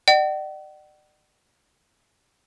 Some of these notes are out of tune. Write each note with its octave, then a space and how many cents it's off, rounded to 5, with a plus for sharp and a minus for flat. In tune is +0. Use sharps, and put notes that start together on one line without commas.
D5 +40 F#5 +45